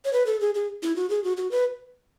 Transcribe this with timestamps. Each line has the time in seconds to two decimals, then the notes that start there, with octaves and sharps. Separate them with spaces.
0.05 C#5
0.13 B4
0.27 A4
0.41 G#4
0.55 G#4
0.83 E4
0.96 F#4
1.10 G#4
1.24 F#4
1.37 F#4
1.51 B4